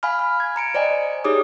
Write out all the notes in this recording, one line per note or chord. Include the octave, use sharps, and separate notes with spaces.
F5 G#5 B5 F6
F6
G#6
A#5 C#7 D7
C5 D5 D#5 G5 G#5
D#4 G4 G#4 C#5 D6 D#6